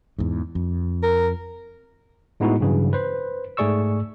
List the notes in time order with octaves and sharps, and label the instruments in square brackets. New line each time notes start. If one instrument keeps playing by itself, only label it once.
[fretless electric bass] E2 G#2
F2
[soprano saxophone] A#4
[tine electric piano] A2 G#3 B3 D#4 E4 F#4
G2 C#3 E3 F#3
B4 C5
G#2 A3 G#4 D5 C#6 E6